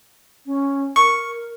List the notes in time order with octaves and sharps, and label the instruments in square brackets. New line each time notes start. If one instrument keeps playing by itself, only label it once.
[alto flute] C#4
[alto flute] A#4 [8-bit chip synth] C#6